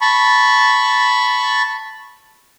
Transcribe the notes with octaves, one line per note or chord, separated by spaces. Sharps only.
A5 B5 C#6